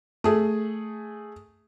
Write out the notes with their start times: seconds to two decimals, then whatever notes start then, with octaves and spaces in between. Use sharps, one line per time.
0.24 A3 G#4